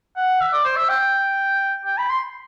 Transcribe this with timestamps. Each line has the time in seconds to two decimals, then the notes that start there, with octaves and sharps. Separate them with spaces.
0.16 F#5
0.40 E5
0.52 D5
0.64 C5
0.76 E5
0.89 G5
1.85 G5
1.98 B5
2.10 C6